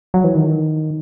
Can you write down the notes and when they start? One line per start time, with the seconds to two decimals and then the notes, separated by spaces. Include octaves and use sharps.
0.14 F#3
0.24 E3
0.35 D#3